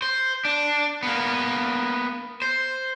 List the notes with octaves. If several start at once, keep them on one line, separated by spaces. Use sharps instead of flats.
C5
D4
A#3 B3
C5